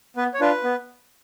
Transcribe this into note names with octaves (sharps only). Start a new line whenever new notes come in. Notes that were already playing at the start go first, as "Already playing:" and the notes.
B3 B4
C#5
D4 F4 B4
B3